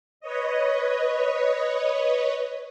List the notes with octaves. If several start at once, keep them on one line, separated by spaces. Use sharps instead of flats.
B4 C#5 D#5